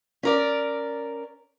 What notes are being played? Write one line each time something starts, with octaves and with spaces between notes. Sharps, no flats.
C#4 A#4 D5